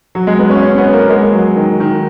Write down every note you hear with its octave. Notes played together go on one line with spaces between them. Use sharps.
F#3
G#3
B3
C#4
C#4
B3
A#3
G#3
F#3
D#3
D#3